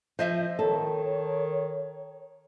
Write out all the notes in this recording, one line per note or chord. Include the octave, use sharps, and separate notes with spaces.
F3 C5 D#5 E5
D#3 A4 C#5